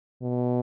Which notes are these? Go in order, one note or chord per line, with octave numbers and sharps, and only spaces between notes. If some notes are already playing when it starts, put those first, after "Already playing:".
B2